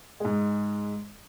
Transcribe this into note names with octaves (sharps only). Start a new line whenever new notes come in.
G#2 G#3